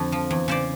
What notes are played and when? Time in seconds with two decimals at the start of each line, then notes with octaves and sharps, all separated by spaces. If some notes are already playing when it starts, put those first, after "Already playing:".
Already playing: F2 D3
0.12 F3
0.31 E2
0.48 C#3 C5 D5